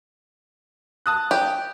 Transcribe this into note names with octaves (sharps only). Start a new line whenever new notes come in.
A5 D#6 F#6
G4